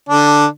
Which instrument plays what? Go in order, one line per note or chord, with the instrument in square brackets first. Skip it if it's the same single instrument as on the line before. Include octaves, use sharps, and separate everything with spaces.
[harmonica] D3 D4